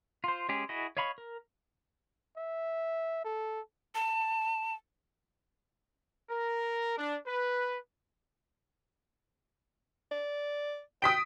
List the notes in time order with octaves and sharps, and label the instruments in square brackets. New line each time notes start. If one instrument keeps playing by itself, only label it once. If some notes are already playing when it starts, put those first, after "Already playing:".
[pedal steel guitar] F4 C5
G#3 C#4 G4 G#4
E4 F#4 G#4 D#5
C#5 D#5 F5 B5 C#6
A#4
[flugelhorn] E5
A4
[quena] A5
[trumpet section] A#4
D4
B4
[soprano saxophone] D5
[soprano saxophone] G5 [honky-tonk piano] D#6 B6 D7